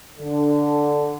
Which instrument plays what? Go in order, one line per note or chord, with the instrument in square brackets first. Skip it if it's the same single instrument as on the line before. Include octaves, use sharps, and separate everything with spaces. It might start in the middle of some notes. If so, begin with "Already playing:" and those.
[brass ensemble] D3